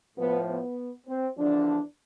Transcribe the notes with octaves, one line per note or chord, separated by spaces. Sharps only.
A2 F3 B3
B3
C4
E2 D3 F3 D4